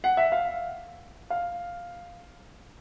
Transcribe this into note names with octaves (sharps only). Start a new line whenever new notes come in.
F#5
E5
F5
F5